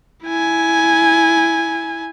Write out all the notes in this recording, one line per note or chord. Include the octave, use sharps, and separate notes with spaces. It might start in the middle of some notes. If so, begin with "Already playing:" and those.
E4 G#5